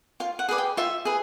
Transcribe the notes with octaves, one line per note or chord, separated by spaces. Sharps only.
F4 F5
F#5
G#4 B4 D5
G5
F4 E5
G#4 B4